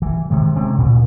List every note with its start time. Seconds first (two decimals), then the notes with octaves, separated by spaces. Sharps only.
0.02 E3
0.30 C3 D#3 G#3
0.55 C3 G#3 C4 C#4
0.78 D2 A#2